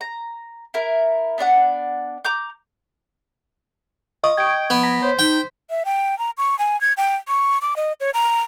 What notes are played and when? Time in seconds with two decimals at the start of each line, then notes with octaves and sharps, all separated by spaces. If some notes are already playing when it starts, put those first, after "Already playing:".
0.01 A#5
0.74 E4 A#4
1.38 B3 D4 D5 F#5
2.25 A#5 D6 G6
4.24 F4 D#5 C#6 D#6
4.37 G5 G#6 D7
4.70 F3 B3
4.83 A#5 B6
5.02 C5 C#5
5.19 D#4 G5
5.70 E5
5.85 G5
6.19 A#5
6.38 C#6
6.59 G#5
6.81 G#6
6.97 G5
7.28 C#6
7.62 D6
7.76 D#5
8.00 C#5
8.14 A#5